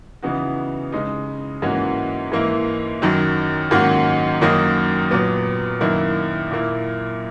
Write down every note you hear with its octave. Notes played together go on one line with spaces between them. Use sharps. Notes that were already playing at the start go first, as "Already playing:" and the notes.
C#3 E3 B3 D#4 F#4
C#3 G#3 D#4
G#2 E3 A#3 C#4 F#4
G#2 E3 A#3 E4
F#2 D#3 F#3
G#2 D#3 A#3 C#4 F#4
F#2 D#3 F#3 A#3 D#4
A#2 F#3 B3
F#2 D#3 A#3 E4
A#2 A#3 E4